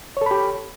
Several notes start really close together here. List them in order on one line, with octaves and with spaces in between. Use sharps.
C#5 A4 B5 G4